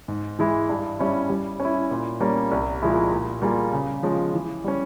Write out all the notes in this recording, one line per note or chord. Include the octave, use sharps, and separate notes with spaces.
G#2
E3 G#3 E4
G2
G3 C#4 E4
G3
C#4
E4
A#2
G3 A#3 C#4
C2
A#2 F3 G#3 E4
A#2
G3 A#3 F4 G#4
C#3
F3 G#3 C#4
E3
G3 C#4